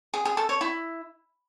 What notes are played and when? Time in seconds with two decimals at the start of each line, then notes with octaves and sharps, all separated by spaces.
0.14 G#4
0.25 G#4
0.37 A4
0.49 C#5
0.61 E4